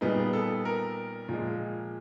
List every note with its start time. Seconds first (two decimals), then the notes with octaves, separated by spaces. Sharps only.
0.01 A#2 G3 B3 D#4 G#4
0.33 A4
0.65 A#4
1.29 A#2 F3 G#3